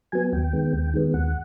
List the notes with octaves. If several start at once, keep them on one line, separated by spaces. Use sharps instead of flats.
F#3 B3 G#5
D#2 G5
D#3 G#3 B3
D#2
D#3 G#3 B3
D#2 F#5